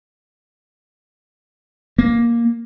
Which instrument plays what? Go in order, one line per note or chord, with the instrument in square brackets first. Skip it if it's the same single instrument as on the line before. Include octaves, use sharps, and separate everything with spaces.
[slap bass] A#3